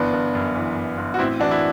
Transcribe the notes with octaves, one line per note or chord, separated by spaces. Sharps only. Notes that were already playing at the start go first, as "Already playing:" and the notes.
Already playing: G1 E3 B3 D4
G1
F#2
E3
G1
G1
F#4
A1 C4 E4
E3 D4 F#4
E4